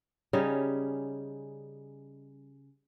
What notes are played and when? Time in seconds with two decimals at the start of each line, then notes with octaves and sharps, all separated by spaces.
0.33 C#3 G3 C#4 D#4